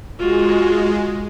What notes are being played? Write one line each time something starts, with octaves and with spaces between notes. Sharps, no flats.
G#3 F4 F#4